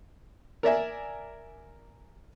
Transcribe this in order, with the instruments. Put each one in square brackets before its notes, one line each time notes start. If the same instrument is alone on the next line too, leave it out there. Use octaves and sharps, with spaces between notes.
[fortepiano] A#4 D5 E5 G#5